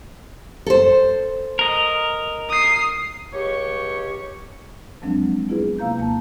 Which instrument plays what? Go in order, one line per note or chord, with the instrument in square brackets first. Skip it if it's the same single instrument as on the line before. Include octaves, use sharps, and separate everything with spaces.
[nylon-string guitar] A4 C5
[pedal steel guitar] A#4 D#5
[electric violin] D#6 C7
[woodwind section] C#2 G4 C#5 C#6
[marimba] F2 F3 F#3 G#3 C4 D4
B3 E4 F4 G#4 B4
C3 A#3 F5 A#5 G6
D#2 A#3 A5